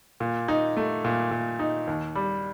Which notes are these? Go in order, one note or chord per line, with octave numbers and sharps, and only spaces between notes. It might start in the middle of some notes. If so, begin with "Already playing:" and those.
A#2
D#4
A3
A#2
A#2
D#4
D#2
G3